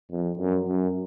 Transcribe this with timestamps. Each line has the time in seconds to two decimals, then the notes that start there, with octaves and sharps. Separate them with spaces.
0.11 F2
0.39 F#2
0.68 F#2